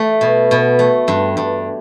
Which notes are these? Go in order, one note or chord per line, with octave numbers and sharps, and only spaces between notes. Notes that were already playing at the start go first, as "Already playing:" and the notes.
Already playing: A3
B2
B2
A3
G2
G2